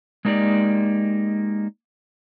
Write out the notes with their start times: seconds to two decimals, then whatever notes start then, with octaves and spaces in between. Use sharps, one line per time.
0.25 G#3 A#3 D#4 G4 D5